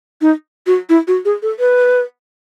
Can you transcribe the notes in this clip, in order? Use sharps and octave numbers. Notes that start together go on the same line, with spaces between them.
D#4
F#4
E4
F#4
G#4
A4
B4